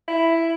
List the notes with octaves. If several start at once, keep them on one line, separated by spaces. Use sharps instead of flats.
E4